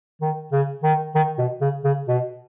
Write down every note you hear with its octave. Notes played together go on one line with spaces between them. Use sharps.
D#3
C#3
D#3
D#3
B2
C#3
C#3
B2